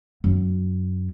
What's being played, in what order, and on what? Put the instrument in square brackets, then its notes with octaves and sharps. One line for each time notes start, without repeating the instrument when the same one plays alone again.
[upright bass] F#2 D#4